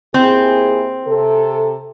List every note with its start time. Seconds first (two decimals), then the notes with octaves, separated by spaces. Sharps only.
0.14 D#2 C4 E4 G#4
1.07 C3 A4